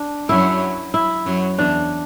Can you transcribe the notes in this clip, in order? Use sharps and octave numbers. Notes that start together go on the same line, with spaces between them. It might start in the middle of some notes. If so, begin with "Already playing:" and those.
Already playing: D4
F#2 F#3 E4
E4
F#2 F#3
E2 E3 D4